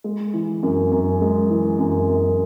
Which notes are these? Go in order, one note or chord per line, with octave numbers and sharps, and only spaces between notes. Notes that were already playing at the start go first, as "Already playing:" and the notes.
G#3
E3
F#2
F#2
G#3
E3
F#2
F#2